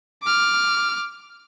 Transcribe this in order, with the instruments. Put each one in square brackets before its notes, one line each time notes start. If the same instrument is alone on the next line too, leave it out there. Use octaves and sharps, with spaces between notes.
[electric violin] D6 F6